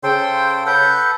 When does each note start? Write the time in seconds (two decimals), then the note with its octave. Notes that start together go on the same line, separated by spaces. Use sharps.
0.03 C#3 A4 C5 G5 C6
0.66 A4 B4 F#5 G6